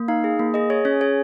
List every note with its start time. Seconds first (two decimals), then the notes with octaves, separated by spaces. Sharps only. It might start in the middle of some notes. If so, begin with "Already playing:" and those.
Already playing: A#3
0.08 D#4 F5
0.24 G#4
0.39 A#3
0.54 G#4 D#5
0.70 G#4 C#5
0.85 C#4 C#5
1.01 G#4 C#5